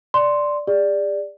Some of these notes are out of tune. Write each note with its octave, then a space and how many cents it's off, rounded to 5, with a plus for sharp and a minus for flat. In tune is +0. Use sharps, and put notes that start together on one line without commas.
D5 +0 C6 +0
G#4 -40 D5 +0